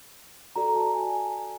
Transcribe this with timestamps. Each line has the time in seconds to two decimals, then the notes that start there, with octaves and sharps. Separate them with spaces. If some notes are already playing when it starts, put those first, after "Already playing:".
0.56 F#4 A4 D5 A#5
0.76 A5
0.95 G#5